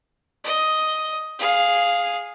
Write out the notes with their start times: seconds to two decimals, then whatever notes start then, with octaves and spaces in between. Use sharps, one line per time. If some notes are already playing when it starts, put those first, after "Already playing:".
0.44 D#5
1.39 G#4 F5